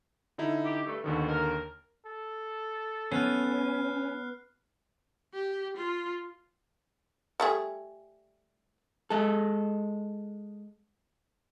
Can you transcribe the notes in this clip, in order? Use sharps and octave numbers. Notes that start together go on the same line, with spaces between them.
D3 D#4 E4
G4
G2 A3
D#2 B2 D3 D#3
A#4
A4
B3 C#4 F6 F#6 C7
G4
F4
G3 A3 G#4
G#3 A4